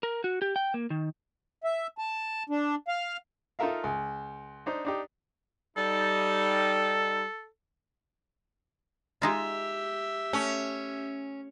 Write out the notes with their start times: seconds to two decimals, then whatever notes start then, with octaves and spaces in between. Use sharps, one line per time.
0.03 A#4
0.24 F#4
0.42 G4
0.56 G5
0.74 A#3
0.90 D#3
1.64 E5
1.98 A5
2.49 D4
2.88 F5
3.59 D#4 F4 A4 A#4 E5 F5
3.84 C#2
4.66 D4 D#4 C5
4.85 D4 D#4 G4
5.77 G3 D#4 A4
9.22 G#3 D#4 F4 G4 E5
10.33 A3 C#4